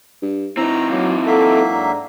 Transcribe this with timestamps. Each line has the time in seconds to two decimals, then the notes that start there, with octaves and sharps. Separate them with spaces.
0.22 G2
0.57 E3 C4 D#4 A#5
0.89 F#3 A#3
1.27 F#3 A#3 A4 E5
1.70 G#2 D4 A#5